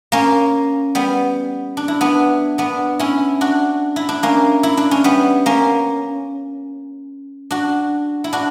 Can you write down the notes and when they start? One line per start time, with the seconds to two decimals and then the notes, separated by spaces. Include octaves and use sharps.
0.12 A#3 C#4
0.95 G3 B3
1.77 D4
1.88 E4
2.01 B3 D4
2.58 B3 D4
2.99 C#4 E4
3.41 D4 F#4
3.96 E4
4.09 D4
4.23 A#3 C#4
4.63 E4
4.77 D4
4.91 C#4
5.04 G3 B3
5.46 A#3 C#4
7.51 D4 F#4
8.24 E4
8.33 D4 F#4